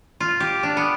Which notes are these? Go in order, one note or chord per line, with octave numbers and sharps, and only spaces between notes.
F4
G4
D4
B3